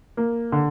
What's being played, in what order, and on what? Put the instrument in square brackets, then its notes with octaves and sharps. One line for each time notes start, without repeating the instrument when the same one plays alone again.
[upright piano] A#3
D3